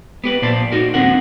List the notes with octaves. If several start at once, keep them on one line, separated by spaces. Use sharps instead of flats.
B3 G4 B4
A#2 C5 D5 A5
D#4 F#4 A#4
D#2 D#3 C4 D4 A#4 F#5